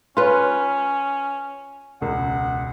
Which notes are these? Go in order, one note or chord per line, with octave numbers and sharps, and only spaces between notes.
C#4 F4 B4 C#5 C6
E1 C#2 F#5